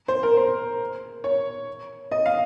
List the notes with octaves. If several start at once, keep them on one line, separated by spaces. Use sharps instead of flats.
C5
A#4
C5
C#5
D#5
F5